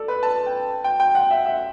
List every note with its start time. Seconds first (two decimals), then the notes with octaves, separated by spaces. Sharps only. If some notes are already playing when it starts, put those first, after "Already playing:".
Already playing: A4 D5
0.08 B4
0.23 A5
0.46 G5
0.84 G5
1.00 G5
1.15 F#5
1.31 E5
1.46 E5